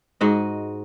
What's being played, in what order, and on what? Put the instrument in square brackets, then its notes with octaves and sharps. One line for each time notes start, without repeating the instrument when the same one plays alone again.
[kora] G#2 F#4 D#5